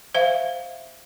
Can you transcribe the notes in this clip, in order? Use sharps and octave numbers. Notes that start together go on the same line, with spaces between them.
C5 E5 F5